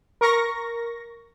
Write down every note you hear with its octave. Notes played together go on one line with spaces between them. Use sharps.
A#4 C#6 A#6